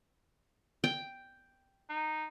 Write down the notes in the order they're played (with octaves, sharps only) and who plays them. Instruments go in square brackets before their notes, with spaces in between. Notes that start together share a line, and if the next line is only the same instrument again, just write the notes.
[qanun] G5
[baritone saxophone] D#4